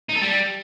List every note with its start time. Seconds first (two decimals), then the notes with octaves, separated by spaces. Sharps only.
0.09 D#4
0.15 A4
0.22 G3